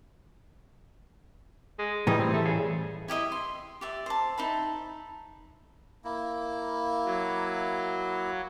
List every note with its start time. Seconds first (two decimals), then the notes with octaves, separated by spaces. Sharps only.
1.79 G#3
2.07 A2 E3 G3 D#4
2.20 C4
2.33 A3
2.45 C#3
3.08 E4 G4 D#5 E5
3.32 C6
3.81 G4 D5 E5
4.06 C5 A5
4.38 D#4 E5 A5 B5
6.04 A#3 E4
7.05 F#3